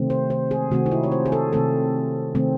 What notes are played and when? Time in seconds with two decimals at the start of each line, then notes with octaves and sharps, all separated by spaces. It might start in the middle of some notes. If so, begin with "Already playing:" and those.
Already playing: C3 D#3 A3 C4
0.10 C5
0.30 C5
0.51 G#4
0.71 C3 D#3 A3 C4 F#4
0.86 D#4
0.92 E4
1.03 C#5
1.12 C5
1.26 G#4
1.32 A4
1.53 C3 D#3 A3 C4 A4
2.35 C3 D#3 A3 C4